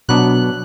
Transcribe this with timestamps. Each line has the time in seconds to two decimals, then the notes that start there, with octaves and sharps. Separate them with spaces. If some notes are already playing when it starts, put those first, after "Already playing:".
0.08 B2 F#3 B3 D4 F#6